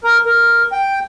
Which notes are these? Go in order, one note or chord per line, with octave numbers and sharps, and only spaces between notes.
A#4
A#4
G5